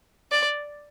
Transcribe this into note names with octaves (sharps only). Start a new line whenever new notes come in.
D5